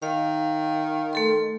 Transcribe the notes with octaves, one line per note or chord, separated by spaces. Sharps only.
D#3 F5
A3 A4 C6